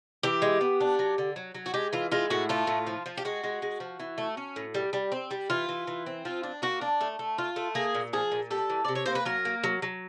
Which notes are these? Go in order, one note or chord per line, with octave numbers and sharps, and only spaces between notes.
E3 G4
G#3
B3
D4
F#3
D3
F#3
F#3
F#4
G#3 G4
E3 F4
G#3 F4
A2 F#4
A3 F4
A2
F3
F3
G4
G#3 F#4
G#3
G#3
F3
E3
A3
C#4
A2
G3
G3
C4
G3
E3 F4
E3
E3
C4
F3 F4
D4
A#3 F#4
D4
A3
A3
F4
A3
A#3 G#4
A#2
F3 G#4
A#2
G3 A4
E3
C3 D5
C#5
A#3 C5
B4
F#3 A#4
A#3
F#3
F#3